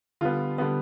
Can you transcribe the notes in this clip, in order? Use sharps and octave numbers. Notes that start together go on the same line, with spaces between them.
D3 G3 B3 F4
D3 G3 B3